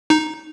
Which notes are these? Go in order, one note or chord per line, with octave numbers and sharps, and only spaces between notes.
D#4